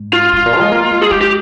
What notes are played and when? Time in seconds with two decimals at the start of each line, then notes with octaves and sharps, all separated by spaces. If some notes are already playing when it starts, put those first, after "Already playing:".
Already playing: G#2
0.13 F4
0.33 G#2
0.46 A#2
0.59 G#3
0.72 A#3
0.91 G#3
1.02 G#4
1.11 G#3 G4
1.21 G4